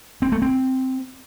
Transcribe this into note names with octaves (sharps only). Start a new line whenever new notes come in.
C4
A3
C4